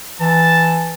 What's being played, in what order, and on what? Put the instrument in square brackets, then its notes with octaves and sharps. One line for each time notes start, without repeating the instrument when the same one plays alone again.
[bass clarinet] E3 [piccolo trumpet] A5